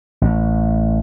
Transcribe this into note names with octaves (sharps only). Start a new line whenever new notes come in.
A1